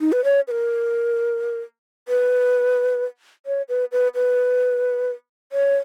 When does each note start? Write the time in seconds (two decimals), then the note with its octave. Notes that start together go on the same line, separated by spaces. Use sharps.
0.01 D#4
0.12 B4
0.24 C#5
0.48 B4
0.51 A#4
2.08 B4
3.46 C#5
3.69 B4
3.92 B4
4.15 B4
5.52 C#5